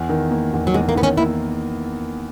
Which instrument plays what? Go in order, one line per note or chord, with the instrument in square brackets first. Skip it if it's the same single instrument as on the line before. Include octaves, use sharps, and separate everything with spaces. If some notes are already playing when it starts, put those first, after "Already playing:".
Already playing: [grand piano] E2
D#3
A#3
E2
[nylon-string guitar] F#3
[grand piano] E2 [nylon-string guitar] G#3
[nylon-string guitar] A#3
[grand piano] D#3 [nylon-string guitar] B3
[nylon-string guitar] C#4
[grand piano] A#3 [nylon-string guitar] E4